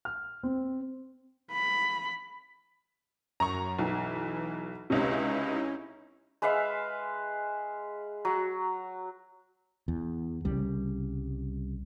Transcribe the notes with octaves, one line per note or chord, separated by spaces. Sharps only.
F6
C4
B5
F#2 A#5 C#6
B1 E3
C#2 C3 C#4 D#4 E4
G#3 B4 E5 F5
F#3
E2
C2 C#3 G3